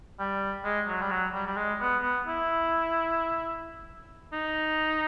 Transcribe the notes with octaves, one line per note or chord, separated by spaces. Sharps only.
G3
G#3
F#3
G3
F#3
G3
G3
G#3
B3
B3
E4
D#4